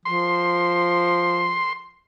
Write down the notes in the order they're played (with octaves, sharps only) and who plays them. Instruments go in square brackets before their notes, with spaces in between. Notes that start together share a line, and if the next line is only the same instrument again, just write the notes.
[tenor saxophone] F3 [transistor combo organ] C6